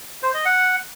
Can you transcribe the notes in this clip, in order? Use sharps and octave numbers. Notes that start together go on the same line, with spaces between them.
C5
D#5
F#5